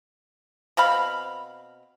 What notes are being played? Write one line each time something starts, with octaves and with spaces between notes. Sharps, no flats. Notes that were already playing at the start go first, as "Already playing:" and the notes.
B2 C4 F5 B5